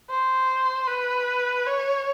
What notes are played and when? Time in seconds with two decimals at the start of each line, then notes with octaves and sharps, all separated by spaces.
0.10 C5
0.88 B4
1.66 C#5